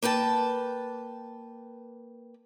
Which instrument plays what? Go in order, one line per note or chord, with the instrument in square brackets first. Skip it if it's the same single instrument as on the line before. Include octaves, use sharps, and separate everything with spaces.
[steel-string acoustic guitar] A#3 B4 G5 A5